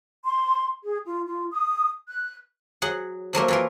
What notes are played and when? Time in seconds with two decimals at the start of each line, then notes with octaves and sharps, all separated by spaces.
0.25 C6
0.84 G#4
1.06 F4
1.25 F4
1.52 D#6
2.08 F#6
2.82 F#3 G#4 F#5
3.33 F3 F#3 A3 A#3
3.48 E3 F4 A#4